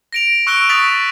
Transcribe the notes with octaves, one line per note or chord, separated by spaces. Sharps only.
A#6 D7 F7
C#6 E6 F#6 C#7 D7 G7
C#6 D#6 A6 B6 F7